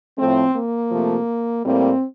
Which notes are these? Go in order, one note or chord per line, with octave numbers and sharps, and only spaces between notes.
A2 F3 A3 C4
A#3
C3 F3 A3
A2 G3 A#3 C4